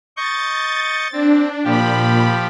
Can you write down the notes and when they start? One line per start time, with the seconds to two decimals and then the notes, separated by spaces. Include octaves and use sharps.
0.17 D#5 C#6 G6 A6
1.12 C4 D4
1.64 A#2 F3 G4 B5